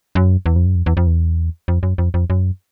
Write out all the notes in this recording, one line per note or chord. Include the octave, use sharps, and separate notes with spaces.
F#2
E2
F2
F#2
F2
E2
F2
E2
F2
F#2
F2
F2
F#2